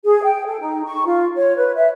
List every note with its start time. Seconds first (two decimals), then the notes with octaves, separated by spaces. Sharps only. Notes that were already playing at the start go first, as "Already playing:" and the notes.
0.04 G#4
0.23 G5
0.46 A4
0.60 D#4
0.84 C#6
1.06 F4
1.36 C#5
1.57 B4
1.75 E5